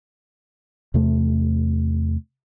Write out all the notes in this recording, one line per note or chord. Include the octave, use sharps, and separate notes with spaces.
E2 C3 A3